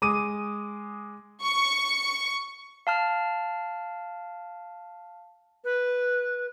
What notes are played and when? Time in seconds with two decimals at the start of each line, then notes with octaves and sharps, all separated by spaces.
0.02 G#3 D6 D#6 D#7
1.45 C#6
2.87 F5 A5 F6
5.64 B4